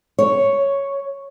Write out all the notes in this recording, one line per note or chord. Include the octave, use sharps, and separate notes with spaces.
C#5